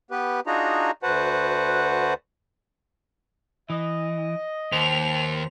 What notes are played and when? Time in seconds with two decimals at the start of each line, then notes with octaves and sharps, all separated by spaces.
0.11 B3 G4 B4
0.47 D4 D#4 F4 F#4 G#4 A#5
1.03 D2 F#4 B4 C5 F#5 A5
3.70 E3 D#5
4.72 D#2 C5 F7